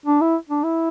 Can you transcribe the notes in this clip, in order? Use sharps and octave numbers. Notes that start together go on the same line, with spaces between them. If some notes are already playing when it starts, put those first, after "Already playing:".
D4
E4
D4
E4